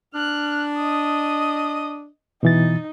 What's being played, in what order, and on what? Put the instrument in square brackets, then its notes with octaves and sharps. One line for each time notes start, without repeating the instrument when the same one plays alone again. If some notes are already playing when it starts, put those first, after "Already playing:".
[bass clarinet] D4 [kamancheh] F6 F#6
[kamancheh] D#5 D#6
[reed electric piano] B2 E3 A6 [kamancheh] D#4